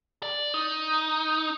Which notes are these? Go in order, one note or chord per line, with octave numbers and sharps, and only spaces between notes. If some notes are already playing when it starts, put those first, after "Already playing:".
D5
D#4